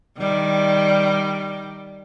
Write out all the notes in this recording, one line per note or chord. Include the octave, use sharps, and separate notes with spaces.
D#3 G3